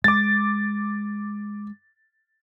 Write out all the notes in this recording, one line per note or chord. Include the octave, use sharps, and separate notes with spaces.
G#3 D6 A6